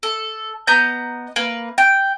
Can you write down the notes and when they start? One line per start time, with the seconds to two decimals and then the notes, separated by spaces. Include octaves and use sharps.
0.03 A4
0.67 B3 D#5 A#5 G6
1.36 A#3 B4
1.78 G5